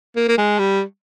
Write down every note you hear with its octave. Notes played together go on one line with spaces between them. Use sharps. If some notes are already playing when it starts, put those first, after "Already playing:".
A#3
A#3
G#3
G3